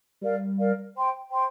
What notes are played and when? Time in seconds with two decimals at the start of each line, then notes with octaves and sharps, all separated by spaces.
0.21 G3 A#4 D5 F5
0.58 A#4 D5 F5
0.94 C5 G5 C6
1.30 C5 G5 C6